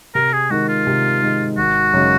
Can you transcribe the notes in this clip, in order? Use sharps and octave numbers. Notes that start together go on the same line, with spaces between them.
C3 A#4
G#4
D#3 G#3 F#4
F4
C3
D#3 G#3
G#1 F#4
F#2 C#3 G#3